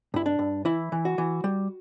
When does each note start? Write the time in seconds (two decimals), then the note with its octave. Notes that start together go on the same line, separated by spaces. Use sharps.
0.14 G2 E4
0.26 D4
0.39 G2
0.65 E3 E4
0.92 E3
1.05 F#4
1.18 E3
1.44 G3